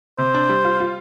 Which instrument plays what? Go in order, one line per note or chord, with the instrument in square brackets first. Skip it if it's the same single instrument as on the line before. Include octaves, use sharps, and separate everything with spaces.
[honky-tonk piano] C3 [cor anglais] C5
[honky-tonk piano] D4
G3
F4
F4